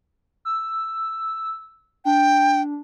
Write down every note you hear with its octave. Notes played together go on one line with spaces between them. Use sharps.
E6
D4 G5